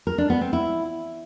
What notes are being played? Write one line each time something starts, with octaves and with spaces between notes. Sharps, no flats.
A#4
D4
B3
C4
E4